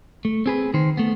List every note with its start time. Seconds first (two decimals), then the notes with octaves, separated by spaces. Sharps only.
0.25 A3
0.46 C4 G#4 B4
0.74 D#3 C5
0.97 A3 B3